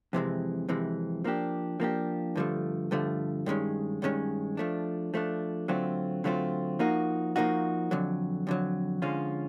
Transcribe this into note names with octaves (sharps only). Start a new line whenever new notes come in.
F2 C3 E3 G#3
F2 C3 E3 G#3
F3 A#3 D4 G4
F3 A#3 D4 G4
G2 D3 F3 A3
G2 D3 F3 A3
G2 D#3 G#3 C#4
G2 D#3 G#3 C#4
F3 A3 D4
F3 A3 D4
D3 F#3 A3 C4 F4
D3 F#3 A3 C4 F4
F3 A#3 D#4 F#4
F3 A#3 D#4 F#4
F2 D3 F#3
F2 D3 F#3
D3 F3 G#3 C#4 F4